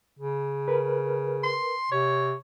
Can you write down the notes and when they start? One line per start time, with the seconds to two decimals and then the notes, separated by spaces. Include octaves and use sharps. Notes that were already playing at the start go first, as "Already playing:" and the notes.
0.19 C#3
0.68 A#4 B4
1.43 C6
1.91 C3 C#5